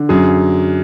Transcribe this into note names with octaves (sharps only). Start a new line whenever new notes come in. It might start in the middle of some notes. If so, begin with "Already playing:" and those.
Already playing: D3
F#2 G#4